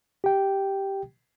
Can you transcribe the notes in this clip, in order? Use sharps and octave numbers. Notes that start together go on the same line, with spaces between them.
G4 G5